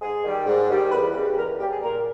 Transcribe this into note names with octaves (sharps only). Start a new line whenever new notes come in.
G#2 G#4
D#3 G3
G#2
D#3 G3
E2 B4
C#3 G3
B4
E2 A#4
C#3 G3 G4
G#4
A#2 A#4